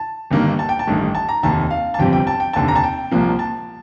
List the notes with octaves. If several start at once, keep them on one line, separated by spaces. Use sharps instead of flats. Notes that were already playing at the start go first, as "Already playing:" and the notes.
Already playing: A5
G1 G2 D#3 A#3
A5
G5
A5
A1 G2 D#3 A3
A5
A#5
F1 D#2 D#3 A5
F5
A5
G1 F2 C3 G3 G5
G5
A5
G5
F1 D#2 D3 A5
A#5
A5
G5
C2 A#2 F3 A#3
A5